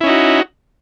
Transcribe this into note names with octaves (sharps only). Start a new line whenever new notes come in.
C#4 D#4 E4 F#4